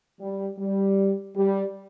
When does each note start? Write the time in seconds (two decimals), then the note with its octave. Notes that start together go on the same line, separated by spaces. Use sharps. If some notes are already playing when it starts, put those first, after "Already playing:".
0.21 G3
0.59 G3
1.36 G3